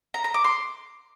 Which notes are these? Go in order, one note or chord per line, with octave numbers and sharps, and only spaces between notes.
A#5
A#5
D6
C6